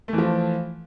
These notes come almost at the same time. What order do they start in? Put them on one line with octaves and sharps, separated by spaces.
A3 E3 F3